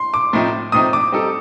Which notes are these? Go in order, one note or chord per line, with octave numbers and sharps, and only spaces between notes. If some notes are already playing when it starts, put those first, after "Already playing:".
Already playing: C6
D6
A2 F3 C4 D#4
A2 F3 C4 D#4 D#6
D6
G3 C4 D#4 A4